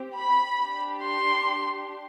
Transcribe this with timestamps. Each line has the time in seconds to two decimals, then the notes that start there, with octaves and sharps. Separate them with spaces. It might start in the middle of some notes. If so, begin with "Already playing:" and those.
Already playing: C4 G4
0.18 B5
0.59 D4 G4
1.02 C6